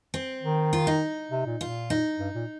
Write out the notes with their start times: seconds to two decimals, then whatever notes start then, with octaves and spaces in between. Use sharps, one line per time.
0.14 C4
0.43 D#3
0.73 F4
0.87 D#4
1.31 C3
1.46 A#2
1.61 A#2 F4
1.90 D#4
2.19 G2
2.35 A#2